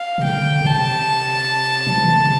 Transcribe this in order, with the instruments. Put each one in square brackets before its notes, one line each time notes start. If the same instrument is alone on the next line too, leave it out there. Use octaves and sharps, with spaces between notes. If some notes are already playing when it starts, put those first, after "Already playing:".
Already playing: [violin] F5
[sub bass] C3
[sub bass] D3 [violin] G5
[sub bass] B2
[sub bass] C3 [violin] A5
[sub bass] F3
E3
D3
C3